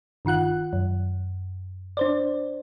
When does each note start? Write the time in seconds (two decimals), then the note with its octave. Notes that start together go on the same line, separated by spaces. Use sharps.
0.25 G1 D#3 F4 F#5 F#6
0.73 F#2
1.97 D4 C5 D5